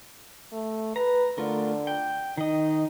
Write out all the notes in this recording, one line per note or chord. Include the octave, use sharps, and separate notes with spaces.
A3
B4 A#5
D3 A3 F4 A#4
G5
D#3 D#4 D#5